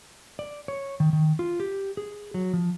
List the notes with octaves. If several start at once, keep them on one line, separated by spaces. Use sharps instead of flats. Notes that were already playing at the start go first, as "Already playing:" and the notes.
D5
C#5
D#3
D#3
F4
G4
G#4
F#3
F3